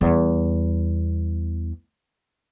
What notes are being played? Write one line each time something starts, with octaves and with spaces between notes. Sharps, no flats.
E2 G3